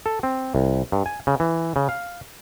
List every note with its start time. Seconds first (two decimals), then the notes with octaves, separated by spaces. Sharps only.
0.06 A4
0.23 C4
0.55 C2
0.92 G2
1.06 G#5
1.27 C#3
1.40 E3
1.76 C#3
1.89 F5